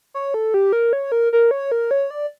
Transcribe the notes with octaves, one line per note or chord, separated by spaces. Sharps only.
C#5
A4
G4
A#4
C#5
A#4
A#4
C#5
A#4
C#5
D5